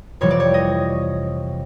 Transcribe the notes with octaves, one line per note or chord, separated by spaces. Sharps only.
F2 C3 E3 G3 C#5
D5
C#5
D#5